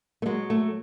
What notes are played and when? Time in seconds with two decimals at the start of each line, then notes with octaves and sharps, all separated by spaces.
0.22 A3
0.26 F#3 G#3
0.50 A3